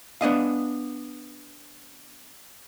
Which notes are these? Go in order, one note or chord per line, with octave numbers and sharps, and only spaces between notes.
B3 D4 D#5 F5